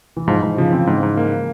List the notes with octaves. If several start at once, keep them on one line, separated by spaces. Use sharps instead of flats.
E3
G#2 F3
G#2 E3
C#3 F3
E3 C4
G#2
G#2
A#3